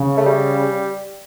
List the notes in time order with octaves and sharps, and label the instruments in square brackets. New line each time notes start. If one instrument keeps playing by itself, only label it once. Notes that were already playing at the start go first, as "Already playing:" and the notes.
Already playing: [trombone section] C#3
[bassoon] A3
G3